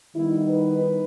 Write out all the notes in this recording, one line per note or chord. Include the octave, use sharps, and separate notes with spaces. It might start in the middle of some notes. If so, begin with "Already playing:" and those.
D#3 G3 B3 D#4 E4
B4